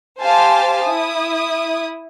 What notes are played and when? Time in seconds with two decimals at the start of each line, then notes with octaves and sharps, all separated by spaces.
0.21 G4 C5 F5 G#5 A5 C6
0.84 E4 D#6